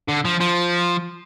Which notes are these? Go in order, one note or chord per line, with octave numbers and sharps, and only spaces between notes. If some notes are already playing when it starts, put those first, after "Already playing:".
D3
F3
F3